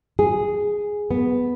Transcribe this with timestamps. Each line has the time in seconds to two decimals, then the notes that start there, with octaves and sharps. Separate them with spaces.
0.19 G#4
1.11 B3